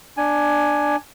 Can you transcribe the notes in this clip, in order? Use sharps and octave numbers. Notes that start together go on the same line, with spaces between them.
D4 G#5